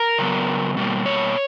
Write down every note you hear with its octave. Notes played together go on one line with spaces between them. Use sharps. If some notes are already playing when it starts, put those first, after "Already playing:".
Already playing: A#4
C#3 F#3 B3
B2 G3 A#3
C#5